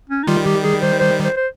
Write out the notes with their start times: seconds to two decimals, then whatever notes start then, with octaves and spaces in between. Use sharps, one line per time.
0.10 C#4
0.23 D#4
0.27 D#3 G3 F4
0.45 G4
0.63 G#4
0.82 C5
0.99 C5
1.24 C5
1.36 C5